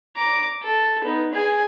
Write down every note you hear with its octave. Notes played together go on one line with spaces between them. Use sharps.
A#5 D6
A4
B3 D#4
G#4 G#5